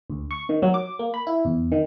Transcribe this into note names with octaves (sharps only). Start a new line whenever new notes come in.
D2
C#6
D#3
F#3
D6
A#3
B5
E4
E2
D#3